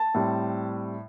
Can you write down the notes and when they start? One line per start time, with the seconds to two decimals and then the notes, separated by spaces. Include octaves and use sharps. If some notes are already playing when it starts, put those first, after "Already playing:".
Already playing: A5
0.14 A2 G3 C4